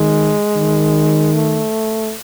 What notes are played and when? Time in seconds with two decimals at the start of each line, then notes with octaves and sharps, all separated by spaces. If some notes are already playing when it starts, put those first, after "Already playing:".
Already playing: D#3 G#3
0.56 D#3
1.33 A3